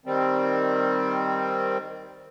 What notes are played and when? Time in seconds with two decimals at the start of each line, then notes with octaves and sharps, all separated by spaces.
0.05 D#3 G3 C4